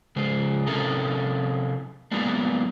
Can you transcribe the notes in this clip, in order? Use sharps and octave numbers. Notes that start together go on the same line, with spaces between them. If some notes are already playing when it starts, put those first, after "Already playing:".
C#3 G#3 C5
C3 C#4 E4 A4 A#4
F#3 G#3 A#3 B3 D4